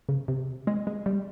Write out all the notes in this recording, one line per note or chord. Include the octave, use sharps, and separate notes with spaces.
C#3
C3
G#3
G#3
G3